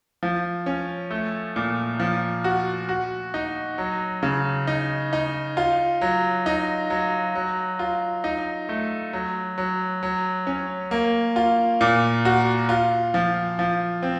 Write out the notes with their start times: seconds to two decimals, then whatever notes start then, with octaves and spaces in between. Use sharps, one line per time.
0.23 F3
0.66 C#4
1.11 A3
1.56 A#2
2.00 F3
2.44 F#4
2.89 F#4
3.34 D#4
3.78 F#3
4.23 C#3
4.67 D#4
5.13 D#4
5.57 F4
6.01 F#3
6.46 D#4
6.90 F#3
7.35 F#3
7.79 F4
8.24 D#4
8.69 A3
9.13 F#3
9.58 F#3
10.03 F#3
10.47 C#4
10.91 A#3
11.36 F4
11.81 A#2
12.25 F#4
12.69 F4
13.14 F3
13.59 F3
14.03 C4